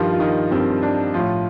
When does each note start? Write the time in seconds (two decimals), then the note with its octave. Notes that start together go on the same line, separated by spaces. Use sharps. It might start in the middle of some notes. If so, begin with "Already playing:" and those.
Already playing: G2 D#3 F3 G3 F4
0.13 F4
0.20 D#3 D#4
0.51 G2 D#3 G3 C4
0.83 D4
1.14 A2 F3 F4